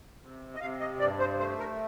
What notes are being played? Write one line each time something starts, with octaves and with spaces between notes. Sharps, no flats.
C3
D#5
C3 F5
D#5
G2 D5
C5
A3 C5
A#4